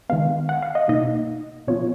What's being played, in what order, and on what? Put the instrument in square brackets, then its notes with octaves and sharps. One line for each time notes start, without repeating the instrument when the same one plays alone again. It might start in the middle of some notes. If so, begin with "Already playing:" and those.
[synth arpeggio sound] D#3 G#3 B3 F5
F#5
F5
D#5
B2 A#3 D#4 D#5
A#2 F3 B3 F4 C#5